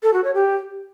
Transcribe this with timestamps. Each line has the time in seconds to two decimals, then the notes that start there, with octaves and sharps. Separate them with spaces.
0.03 A4
0.13 F#4
0.24 C#5
0.35 G4